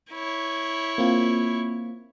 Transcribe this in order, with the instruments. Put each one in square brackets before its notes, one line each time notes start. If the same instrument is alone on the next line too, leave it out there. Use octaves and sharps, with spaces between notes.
[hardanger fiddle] E4 C#5
[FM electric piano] A#3 C4 F4